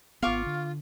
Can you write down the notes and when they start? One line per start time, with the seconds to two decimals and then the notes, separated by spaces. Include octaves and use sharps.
0.22 G#1 B3 F4 F5 C#6 D6
0.46 D3